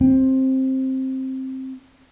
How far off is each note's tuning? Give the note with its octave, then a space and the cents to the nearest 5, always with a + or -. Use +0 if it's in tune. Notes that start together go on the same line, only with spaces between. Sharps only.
C4 +10